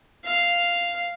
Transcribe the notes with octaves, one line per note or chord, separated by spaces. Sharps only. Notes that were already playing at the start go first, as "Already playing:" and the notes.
F5